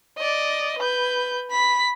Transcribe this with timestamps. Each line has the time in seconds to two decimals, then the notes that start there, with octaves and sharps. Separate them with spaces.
0.18 D5 D#5
0.78 B4 G6
1.50 B5 B6